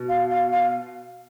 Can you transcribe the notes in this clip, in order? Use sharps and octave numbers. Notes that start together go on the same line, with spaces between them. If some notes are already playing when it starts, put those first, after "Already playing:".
Already playing: B2
F5
F5
F5